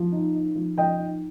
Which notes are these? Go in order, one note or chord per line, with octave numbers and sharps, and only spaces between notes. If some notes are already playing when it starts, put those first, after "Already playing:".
Already playing: F3
D#4
D#4
F3
F3 D#5 G5
D#4